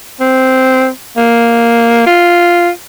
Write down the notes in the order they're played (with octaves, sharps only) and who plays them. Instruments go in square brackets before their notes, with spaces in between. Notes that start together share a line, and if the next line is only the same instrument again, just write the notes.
[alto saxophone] C4
A#3
F4